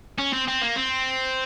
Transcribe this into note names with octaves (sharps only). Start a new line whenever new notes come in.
C#4
C4
C4
A#3
C4